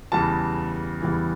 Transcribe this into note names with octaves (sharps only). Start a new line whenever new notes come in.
E2 C#3 E3 G3 A5
E2 C#3 E3 G3